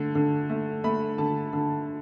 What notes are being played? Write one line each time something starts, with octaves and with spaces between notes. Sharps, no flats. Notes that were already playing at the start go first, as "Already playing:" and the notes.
Already playing: D3 A3
D3
A3
A3 B5
D3 A5
D3